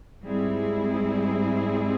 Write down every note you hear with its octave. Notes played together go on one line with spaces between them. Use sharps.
G#2 G3 C4 E4 G#4